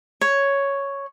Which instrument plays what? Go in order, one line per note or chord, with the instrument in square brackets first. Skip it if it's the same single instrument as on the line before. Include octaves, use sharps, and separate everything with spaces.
[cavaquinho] C#5